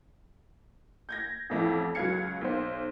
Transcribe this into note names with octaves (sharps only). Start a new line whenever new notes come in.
G6 G#6 A#6
A1 F2 E4
C#2 F#3 F5 G#6 C#7
B1 C5